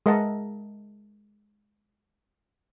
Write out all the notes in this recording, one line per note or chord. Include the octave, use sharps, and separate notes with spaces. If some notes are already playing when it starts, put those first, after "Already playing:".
G#3 A#4 D#5 E5 F#5 A5